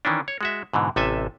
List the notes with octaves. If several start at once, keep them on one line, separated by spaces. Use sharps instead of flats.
D#3 E3 C#4 D4
C#5
G#3 F#4 E5
G#2 B2 D3 E3
A1 C3 A4 E5 G#5